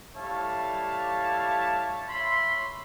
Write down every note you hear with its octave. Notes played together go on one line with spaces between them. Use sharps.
G3 A3 E4 C#5 F5 A5
C#5 E5 B5 C6